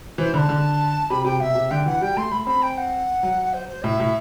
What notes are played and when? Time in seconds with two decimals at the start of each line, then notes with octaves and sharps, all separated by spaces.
0.18 E3 C5
0.34 D3 B5
0.38 A5
0.49 D3
1.10 C3 B5
1.24 C3 G5
1.39 B2 E5
1.55 C3
1.70 D3 G5
1.86 E3 F#5
2.01 G3 G5
2.17 A3 C6
2.31 A3 B5
2.47 C4 B5
2.62 G5
2.77 F#5
3.23 F#3
3.53 C5
3.68 C5
3.84 A2 E5
4.00 A2